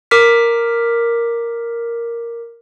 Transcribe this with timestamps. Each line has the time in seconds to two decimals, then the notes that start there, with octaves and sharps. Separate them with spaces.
0.11 A#4 D6 F6 B6